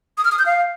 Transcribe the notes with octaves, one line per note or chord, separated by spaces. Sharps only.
D#6
F6
D#6
G6
F5